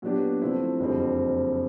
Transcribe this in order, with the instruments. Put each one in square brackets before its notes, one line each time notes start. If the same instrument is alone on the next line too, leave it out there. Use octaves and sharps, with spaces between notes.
[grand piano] A#2 F#3 B3 D4 G4
C3 F3 A3 C4 E4
F#1 F2 D3 G3 C4